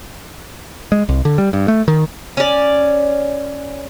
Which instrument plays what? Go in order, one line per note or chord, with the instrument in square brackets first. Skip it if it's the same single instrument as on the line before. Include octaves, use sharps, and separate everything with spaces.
[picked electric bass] G#3
C2
D3
G3
G2
A3
D#3
[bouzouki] C#4 D5